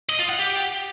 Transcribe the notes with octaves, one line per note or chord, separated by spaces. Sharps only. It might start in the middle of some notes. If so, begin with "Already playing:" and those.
D#5
F4
F#5
G4